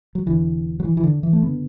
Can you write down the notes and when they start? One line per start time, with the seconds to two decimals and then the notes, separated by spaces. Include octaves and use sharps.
0.15 F#3
0.26 E1 E2 D3 E3
0.80 F#3
0.85 E3
0.97 E3
1.03 D3
1.23 E3
1.33 A3
1.42 F#1 D3 B3